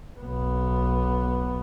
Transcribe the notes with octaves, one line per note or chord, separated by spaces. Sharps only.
B1 B3